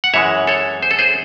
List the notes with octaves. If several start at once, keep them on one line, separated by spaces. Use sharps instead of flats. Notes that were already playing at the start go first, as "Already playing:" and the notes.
F#5
F#2 E3 G#3 C#5 E5
A4 C#5
C5
A4
G#4 C5